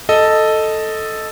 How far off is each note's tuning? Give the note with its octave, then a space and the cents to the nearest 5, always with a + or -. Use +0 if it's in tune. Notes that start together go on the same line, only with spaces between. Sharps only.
A4 +0 D#5 +0